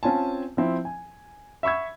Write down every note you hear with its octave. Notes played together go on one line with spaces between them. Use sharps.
C4 C#4 F4 G#5 A5
F3 C4 E4
G#5
E5 B5 C#6 E6 G#6